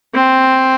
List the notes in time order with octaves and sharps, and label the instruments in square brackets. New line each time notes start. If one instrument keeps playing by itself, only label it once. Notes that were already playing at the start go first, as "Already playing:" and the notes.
[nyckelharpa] C4